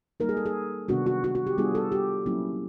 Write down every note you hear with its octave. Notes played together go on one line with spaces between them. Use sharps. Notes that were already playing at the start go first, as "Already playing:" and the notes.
G3 A#3 D#4 A#4
G#4
A4
G#4
C3 D#3 G3 B3 D4 F#4
F#4
F#4
F#4
G4
G3 B3 D4 F4 G#4
A4
G4
F#3 A#3 C#4 E4